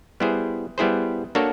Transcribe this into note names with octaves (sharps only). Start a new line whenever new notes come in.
G3 B3 E4 G#4 C5
G3 B3 E4 G#4 C5
A#3 D4 F#4 A4 C#5